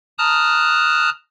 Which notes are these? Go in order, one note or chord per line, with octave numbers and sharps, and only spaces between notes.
A5 A#5 D#6 F6 F#6